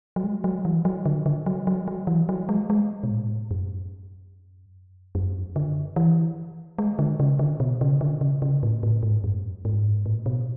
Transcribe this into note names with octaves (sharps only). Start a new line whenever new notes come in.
F#3
G#3
F#3
E3
F#3
D3
D3
F#3
F#3
F#3
E3
F#3
G#3
G#3
B2
A2
F#2
F#2
D3
E3
G#3
D3
C#3
D3
B2
C#3
D3
C#3
C#3
A2
A2
G#2
F#2
G#2
A2
B2